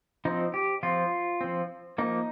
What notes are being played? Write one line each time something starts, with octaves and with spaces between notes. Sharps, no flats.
F3 C4 D#4
G4
F3 C4 F4
F3 C4
F3 A#3 D#4